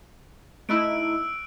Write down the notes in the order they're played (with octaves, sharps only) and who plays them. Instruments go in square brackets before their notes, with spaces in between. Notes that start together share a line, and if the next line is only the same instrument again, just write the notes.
[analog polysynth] A3 D#4 E4 [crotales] E6 F#6 D7